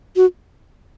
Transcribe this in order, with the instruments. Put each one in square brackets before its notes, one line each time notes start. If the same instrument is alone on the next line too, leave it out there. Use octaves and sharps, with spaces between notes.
[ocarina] F#4